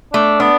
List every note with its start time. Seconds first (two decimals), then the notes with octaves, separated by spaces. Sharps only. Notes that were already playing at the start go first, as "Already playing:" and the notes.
0.13 A3 D4
0.40 B3 D4